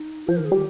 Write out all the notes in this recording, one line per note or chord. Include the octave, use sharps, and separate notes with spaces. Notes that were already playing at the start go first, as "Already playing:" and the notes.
Already playing: D#4
F3 C5
D#3 A#4
G#4
G3 G4